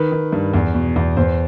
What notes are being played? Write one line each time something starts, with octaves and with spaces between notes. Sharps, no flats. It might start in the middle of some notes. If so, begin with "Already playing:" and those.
Already playing: D#3 B4
D#3
G2
E2
B2
E2
E2 C5